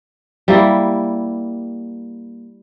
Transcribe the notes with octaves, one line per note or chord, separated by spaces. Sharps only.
G3 A#3 E4